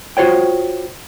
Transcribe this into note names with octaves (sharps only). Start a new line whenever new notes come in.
F4 F#4 C5 C#5 G5